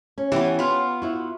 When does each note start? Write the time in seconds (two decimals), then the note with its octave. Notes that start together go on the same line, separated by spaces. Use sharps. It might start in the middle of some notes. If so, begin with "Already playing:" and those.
0.18 C#4
0.32 E3 B3 C#4 G4
0.59 B3 F4
1.02 E4 F#4